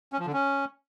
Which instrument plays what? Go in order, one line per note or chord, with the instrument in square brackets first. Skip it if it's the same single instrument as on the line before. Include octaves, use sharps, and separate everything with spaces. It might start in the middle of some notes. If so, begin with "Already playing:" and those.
[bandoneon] C#4
F3
D3
C#4